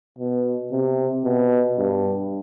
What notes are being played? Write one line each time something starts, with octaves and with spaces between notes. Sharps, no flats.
B2
C3
B2
G2